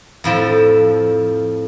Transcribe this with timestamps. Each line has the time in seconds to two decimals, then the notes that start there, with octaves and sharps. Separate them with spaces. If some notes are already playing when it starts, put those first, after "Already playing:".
0.24 F2 A2 F3